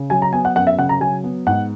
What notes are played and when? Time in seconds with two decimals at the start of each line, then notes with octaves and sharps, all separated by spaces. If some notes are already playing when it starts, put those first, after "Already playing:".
Already playing: C#3
0.10 F#3 G#5
0.22 A#5
0.33 B3 G#5
0.45 F#5
0.56 F#2 F#5
0.67 E5
0.78 C#3 F#5
0.89 A#5
1.00 F#3 G#5
1.24 B3
1.47 G#2 F#5